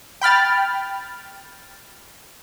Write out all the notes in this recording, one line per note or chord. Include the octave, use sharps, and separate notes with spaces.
G5 B5 F6 A6